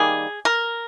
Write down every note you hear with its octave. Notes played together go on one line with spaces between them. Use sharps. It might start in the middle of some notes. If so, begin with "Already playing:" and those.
Already playing: D#3 G3 A#3 G#4
A#4